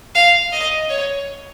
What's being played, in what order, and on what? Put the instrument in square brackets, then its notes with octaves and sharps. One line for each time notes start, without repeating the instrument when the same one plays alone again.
[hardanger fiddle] F5
D#5
C#5